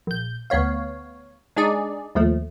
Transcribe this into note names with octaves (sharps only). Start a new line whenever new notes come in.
A#1 G6
D2 B3 C#5 F5
G#3 D4 D#4 G#4 D5
D#2 F3 A3